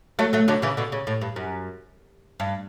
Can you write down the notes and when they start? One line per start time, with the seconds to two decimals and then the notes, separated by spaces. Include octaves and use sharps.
0.19 F#3 A3
0.33 F#3 A3
0.48 D3 F#3
0.62 C#3 E3
0.77 B2 D3
0.92 C#3
1.07 A2
1.21 G2
1.36 F#2
2.40 G2